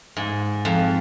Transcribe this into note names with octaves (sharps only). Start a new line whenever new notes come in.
G#2
F2